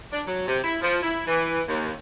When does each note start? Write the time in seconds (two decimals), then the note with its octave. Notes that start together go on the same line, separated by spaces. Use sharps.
0.12 D4
0.27 F#3
0.47 C3
0.64 E4
0.82 F3
1.02 E4
1.27 E3
1.68 D#2